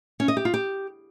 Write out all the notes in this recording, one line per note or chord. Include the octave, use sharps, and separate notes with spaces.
C#4
D#5
G4
F4
G4